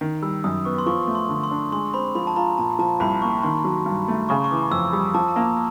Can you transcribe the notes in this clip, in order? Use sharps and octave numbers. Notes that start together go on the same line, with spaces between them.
D#3
G3 E6
F#2 D#6
B3 C#6
C6
F3 C#6
A3
C6
D3
C6
D4
G#3 C6
C4 B5
F3 B5
A5
F4 A#5
A#2 A5
F3 A5
C2 B5
A#3 C#6
D#3 C6
F#3
G2
A3
C#3 C#6
C#6
E3 D6
F2 E6
G3 D#6
F3 A5
A5
A#3 A#5